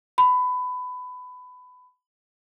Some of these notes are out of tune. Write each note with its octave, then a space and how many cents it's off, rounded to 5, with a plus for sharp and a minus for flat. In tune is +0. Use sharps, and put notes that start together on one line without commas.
B5 +20